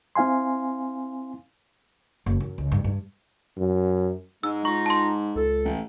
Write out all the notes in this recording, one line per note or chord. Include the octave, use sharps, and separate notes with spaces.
C4 E4 F5 G#5 C6
F#1
F#2
C#2
G2
G2
F#2
G#2 G#3 E6
D#4 F4 A#5 C#6
A5 C6
C#2 A4
A1